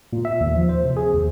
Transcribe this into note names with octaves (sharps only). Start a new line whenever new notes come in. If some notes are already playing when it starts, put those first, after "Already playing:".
A#2
E5
D#2
F3
C5
C3
G#4
D#2